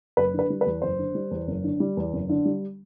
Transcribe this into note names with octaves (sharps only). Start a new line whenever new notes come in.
F#1 B4
D3
B4
G3
B4
E2
F#1 C5
D3
G3
E2
F#1
D3
G3
E2
F#1
D3
G3